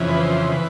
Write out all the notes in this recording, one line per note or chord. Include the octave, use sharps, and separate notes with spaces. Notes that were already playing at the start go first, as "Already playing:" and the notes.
Already playing: F2 C#3 E3
B4
C5
E3 B4